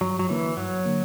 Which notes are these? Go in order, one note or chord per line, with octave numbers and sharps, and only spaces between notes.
G2 F#3
F#3
D3 E3 A#3
G2 F#3
D3 A#3